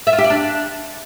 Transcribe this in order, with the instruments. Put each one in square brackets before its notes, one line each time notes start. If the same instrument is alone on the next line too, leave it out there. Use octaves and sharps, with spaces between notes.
[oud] E5
F4
G4
D5
D4